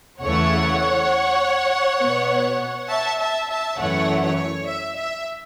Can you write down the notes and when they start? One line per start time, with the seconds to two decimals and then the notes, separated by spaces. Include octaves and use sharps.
0.21 E2 C#3 E3 A3 C#5 F#5
2.00 B2 B3
2.89 E5 A5
3.19 E5 A5
3.48 E5 A5
3.78 F#2 E3 A3 C#5 F#5
4.22 C#5
4.68 E5
4.98 E5